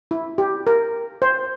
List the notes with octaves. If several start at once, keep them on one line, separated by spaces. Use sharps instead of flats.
E4
G4
A#4
C5